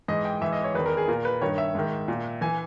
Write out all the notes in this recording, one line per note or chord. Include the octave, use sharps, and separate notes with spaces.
G#2 E3 D#5
G5
G#2 E3 E5
D#5
C#5
E2 D#3 B4
A#4
G#4
A#2 A#4
B4
G2 D#3 C#5
E5
G#2 D#3
A#2
E3 G#5